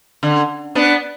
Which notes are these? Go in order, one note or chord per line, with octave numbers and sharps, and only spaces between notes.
D3
B3 D4